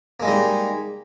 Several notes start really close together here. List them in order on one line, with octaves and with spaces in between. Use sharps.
A#3 G#3 G3 D#4